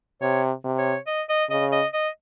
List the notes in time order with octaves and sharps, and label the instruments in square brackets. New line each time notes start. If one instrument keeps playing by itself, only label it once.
[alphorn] C3 [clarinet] C#5
[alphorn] C3
[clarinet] C#5
D#5
D#5
[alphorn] C#3 [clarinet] D#5
[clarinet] D#5
D#5